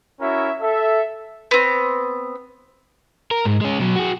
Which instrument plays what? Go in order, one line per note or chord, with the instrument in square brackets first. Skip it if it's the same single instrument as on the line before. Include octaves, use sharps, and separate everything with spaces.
[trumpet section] C#4 E4 F#4 A#4 E5
A4 E5
[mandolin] B3 C4
[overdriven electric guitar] A#4
G#2
G#3 C#4
B2 F#3
F#4 G#4